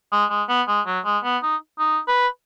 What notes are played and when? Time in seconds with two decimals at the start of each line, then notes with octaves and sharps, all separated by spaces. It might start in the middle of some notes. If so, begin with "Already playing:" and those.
0.12 G#3
0.30 G#3
0.49 B3
0.68 G#3
0.87 F#3
1.05 G#3
1.24 B3
1.43 D#4
1.79 D#4
2.08 B4